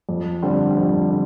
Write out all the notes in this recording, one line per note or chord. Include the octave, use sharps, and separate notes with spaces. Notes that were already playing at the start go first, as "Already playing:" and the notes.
F2
D3 G3 C4
F2
D3